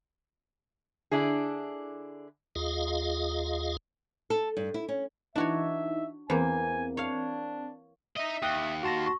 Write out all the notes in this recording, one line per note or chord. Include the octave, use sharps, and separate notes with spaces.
D3 D4 E4 G#4
D#2 F4 G#4 D#5 F5
A4
G2
E4
C#4
E3 D4 D#4 F#4 C#5 E5
E2 A#3 C4 G#5
D4 C#5 F5
D#4 D#5 E5
D#2 G5 D#6 F#6 G7
F#4 A5 C6 A#6
C#6